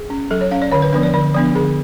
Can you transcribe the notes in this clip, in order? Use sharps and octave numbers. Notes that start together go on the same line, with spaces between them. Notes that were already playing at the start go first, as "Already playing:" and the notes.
Already playing: G#4
C#4
F#3 A4
C#5
C#4 F5
D5
D3 C#5
B4
F3 B3 D4 B4
D5
D3 D5
F3 B3 D4 D5
D3 G#4